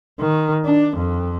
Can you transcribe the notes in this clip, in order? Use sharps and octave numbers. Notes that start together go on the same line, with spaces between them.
D#3
D4
F2